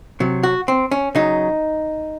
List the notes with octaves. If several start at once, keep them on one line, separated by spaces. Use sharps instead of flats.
C3 F#3
F#4
C4
C#4
C#3 F#3 D#4